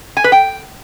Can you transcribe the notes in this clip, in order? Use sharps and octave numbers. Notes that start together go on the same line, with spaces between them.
G#5
B4
G5